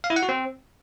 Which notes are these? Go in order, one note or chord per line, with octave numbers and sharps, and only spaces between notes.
F5
E4
F#5
F#4
C4